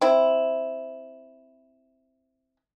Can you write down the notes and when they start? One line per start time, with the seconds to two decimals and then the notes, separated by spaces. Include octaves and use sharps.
0.01 C4 E4